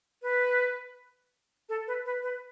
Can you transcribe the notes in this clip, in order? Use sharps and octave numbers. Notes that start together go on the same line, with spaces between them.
B4
A4
B4
B4
B4